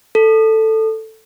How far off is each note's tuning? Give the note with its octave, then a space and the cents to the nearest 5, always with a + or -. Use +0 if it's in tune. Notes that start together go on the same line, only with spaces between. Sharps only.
A4 +5